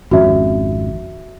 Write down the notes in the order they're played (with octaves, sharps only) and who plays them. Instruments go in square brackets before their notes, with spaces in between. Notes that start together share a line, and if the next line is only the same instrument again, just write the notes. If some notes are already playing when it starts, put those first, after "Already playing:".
[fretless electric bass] G#1 F2 C#4 [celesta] F#4 E5